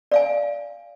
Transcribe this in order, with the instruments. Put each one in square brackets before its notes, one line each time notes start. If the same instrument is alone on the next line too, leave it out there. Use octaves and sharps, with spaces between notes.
[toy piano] D5 F5 G#5